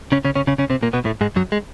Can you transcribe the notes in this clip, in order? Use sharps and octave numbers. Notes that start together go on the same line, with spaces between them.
C#3 C#4
C#3 C#4
C#3 C#4
C#3 C#4
C#3 C#4
C3 C4
A#2 A#3
B2 B3
A2 A3
G#2 G#3
F#2 F#3
G#3